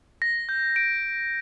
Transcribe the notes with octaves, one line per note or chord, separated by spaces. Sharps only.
A#6
G6
D7